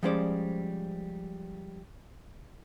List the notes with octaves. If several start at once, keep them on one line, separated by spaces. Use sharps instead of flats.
F3 G3 G#3 C#4 C5 D5